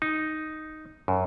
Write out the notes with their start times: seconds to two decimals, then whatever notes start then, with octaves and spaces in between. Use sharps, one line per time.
0.02 D#4
1.08 F#2